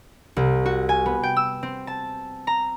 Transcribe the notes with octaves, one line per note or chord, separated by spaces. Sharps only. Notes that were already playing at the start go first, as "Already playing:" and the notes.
C2
F#4
G#5
B3
G5
E6
C4
A5
A#5